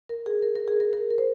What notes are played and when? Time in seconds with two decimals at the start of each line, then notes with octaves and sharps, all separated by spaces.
0.09 A#4
0.26 G#4
0.42 A#4
0.56 A#4
0.68 G#4
0.80 A#4
0.93 A#4
1.10 A#4
1.18 C5